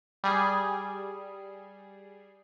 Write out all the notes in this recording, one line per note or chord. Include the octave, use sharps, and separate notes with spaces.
G3 G#4